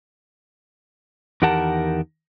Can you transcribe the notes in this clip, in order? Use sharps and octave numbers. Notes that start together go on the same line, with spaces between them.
E2 D#3 G4 A#4 F#5 A5